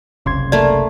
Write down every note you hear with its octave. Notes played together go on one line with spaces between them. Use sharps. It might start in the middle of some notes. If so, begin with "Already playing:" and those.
F#1 C2 C#3 G#4 C6 G#6
A3 A#3 D5